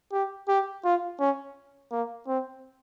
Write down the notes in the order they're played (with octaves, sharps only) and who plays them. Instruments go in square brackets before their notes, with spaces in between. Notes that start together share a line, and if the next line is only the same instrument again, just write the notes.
[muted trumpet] G4
G4
F4
C#4
A#3
C4